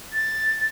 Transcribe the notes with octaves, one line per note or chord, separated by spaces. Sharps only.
A6